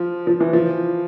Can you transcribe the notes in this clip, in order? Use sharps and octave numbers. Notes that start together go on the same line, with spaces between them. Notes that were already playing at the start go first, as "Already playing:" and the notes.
Already playing: F3
F3
E3
F3